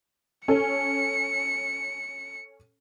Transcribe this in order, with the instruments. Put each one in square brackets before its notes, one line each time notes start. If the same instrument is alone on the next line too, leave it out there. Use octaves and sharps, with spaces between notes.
[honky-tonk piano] C#4 A4 [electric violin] C#7